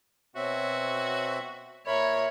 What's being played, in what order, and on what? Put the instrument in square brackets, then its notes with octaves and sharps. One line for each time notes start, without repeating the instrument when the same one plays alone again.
[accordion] B2 C4 E5 [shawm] F#4 [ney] C#5
[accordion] A#2 A#4 [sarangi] C#5 [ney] E5 [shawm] B5